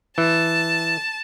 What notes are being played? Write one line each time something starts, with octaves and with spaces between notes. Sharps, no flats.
E3 A5